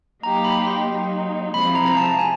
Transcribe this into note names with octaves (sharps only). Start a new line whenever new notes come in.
F#3 A#3 D#4 G4 A#5
B5
C6
F#3 A#3 D#4
C3 F3 G#3 C4 E4 B5
A#5
A#5
A5
G#5